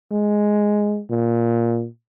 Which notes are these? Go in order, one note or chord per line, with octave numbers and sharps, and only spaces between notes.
G#3
A#2